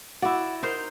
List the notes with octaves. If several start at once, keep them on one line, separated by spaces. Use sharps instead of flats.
E4 F#4 D5
D#4 A#4 C5